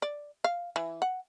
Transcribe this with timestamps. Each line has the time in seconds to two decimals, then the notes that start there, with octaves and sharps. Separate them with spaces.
0.02 D5
0.44 F5
0.76 E3
1.02 F#5